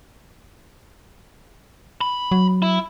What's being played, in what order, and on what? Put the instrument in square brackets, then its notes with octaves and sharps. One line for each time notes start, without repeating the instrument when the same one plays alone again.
[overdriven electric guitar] B5
[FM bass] F#3
[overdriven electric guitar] E4